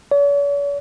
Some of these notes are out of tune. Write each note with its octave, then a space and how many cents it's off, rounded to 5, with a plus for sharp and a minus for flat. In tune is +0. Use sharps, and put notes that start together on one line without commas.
C#5 +45